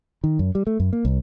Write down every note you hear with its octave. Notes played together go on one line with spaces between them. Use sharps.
D#3
F#2
G3
A3
F#2
A#3
C2